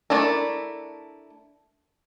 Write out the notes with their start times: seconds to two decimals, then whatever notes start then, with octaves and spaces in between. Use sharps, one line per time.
0.10 A3 D4 E4 A#4